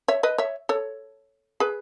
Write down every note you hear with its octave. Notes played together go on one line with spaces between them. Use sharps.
C#5 E5
B4 D#5
C#5 E5
A4 C#5
G#4 B4